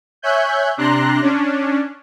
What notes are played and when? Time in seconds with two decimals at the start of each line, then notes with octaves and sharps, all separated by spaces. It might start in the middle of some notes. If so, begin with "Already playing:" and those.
0.22 C#5 E5 G#5 F#6 G6
0.77 C3 D4 A#5 C6 F#6 A#6
1.22 C#4 D4